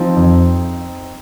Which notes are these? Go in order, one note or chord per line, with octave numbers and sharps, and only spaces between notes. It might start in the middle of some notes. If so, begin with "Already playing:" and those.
Already playing: F3 C4 D#4
F2